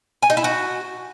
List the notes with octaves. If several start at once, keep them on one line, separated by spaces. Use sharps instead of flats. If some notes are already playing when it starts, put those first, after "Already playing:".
G#5
D#4
E4
F#4